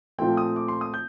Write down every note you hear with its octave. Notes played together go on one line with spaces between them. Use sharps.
A#2 F3 A3 C4 G5
D#6
D6
C6
D#6
G6